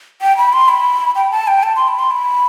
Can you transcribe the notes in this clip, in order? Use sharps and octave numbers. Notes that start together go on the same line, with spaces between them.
G5
B5
C6
B5
G5
A5
G5
A5
C6
B5
C6
B5